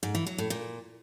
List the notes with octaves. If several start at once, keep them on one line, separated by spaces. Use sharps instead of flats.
G#2
E3
F#3
A2
A#2